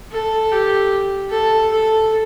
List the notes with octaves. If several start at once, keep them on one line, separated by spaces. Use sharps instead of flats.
A4
G4
A4
A4